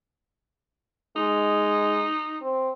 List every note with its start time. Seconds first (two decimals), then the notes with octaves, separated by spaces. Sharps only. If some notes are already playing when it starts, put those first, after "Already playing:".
1.16 G#3 D#4
2.41 C4